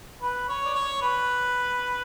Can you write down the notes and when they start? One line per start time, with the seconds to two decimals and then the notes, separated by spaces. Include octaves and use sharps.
0.22 B4
0.49 C#5
0.65 D5
0.74 C#5
1.02 B4